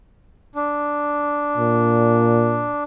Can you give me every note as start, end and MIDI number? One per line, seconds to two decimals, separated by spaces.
0.56 2.84 62
1.57 2.74 46